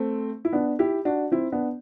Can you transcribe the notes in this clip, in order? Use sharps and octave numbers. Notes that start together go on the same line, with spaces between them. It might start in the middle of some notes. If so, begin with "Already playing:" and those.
Already playing: A3 C4
E4
B3 D4
E4 G4
D4 F#4
C4 E4
B3 D4